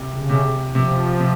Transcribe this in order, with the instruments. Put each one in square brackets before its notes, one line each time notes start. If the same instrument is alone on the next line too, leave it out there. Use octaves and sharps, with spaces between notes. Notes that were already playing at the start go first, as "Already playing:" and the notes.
Already playing: [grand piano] C3
[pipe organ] C#3
[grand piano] C3
[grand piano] C3 [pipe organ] F3
[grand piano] C3